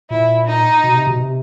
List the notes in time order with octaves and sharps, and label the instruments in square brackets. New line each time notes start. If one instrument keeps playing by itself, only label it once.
[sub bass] A#2 [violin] E4
[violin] D#4
[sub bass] B2
C3
B2
C3